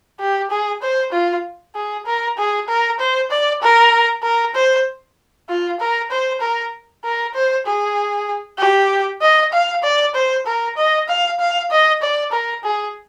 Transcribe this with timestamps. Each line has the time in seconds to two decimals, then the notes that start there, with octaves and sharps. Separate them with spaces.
0.20 G4
0.50 G#4
0.82 C5
1.12 F4
1.75 G#4
2.06 A#4
2.38 G#4
2.68 A#4
2.99 C5
3.31 D5
3.62 A#4
4.23 A#4
4.55 C5
5.49 F4
5.80 A#4
6.11 C5
6.41 A#4
7.04 A#4
7.34 C5
7.66 G#4
8.59 G4
9.22 D#5
9.53 F5
9.83 D5
10.15 C5
10.46 A#4
10.77 D#5
11.09 F5
11.40 F5
11.70 D#5
12.02 D5
12.32 A#4
12.63 G#4